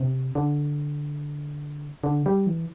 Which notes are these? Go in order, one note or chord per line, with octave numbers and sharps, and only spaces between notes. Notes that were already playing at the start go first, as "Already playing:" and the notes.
Already playing: C3
D3
D3
G3
E3